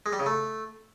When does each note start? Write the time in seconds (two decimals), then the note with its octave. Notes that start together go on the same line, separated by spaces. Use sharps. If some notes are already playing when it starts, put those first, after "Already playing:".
0.06 G#3
0.13 G3
0.19 C#3
0.26 A3